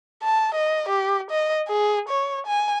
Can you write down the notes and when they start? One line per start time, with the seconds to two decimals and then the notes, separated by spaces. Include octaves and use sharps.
0.23 A5
0.55 D#5
0.89 G4
1.31 D#5
1.69 G#4
2.09 C#5
2.47 G#5